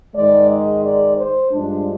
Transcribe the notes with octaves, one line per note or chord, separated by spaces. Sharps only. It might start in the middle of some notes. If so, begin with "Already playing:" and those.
G#2 D#3 G#3 D5
D#5
D5
C5
G2 F3 G#3 D4